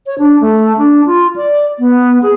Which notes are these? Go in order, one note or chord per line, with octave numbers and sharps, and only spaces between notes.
C#5
D4
A3
D4
F4
D5
B3
G#4